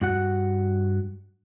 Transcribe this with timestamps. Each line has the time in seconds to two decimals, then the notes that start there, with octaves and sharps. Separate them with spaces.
0.01 G2 F#4 F#5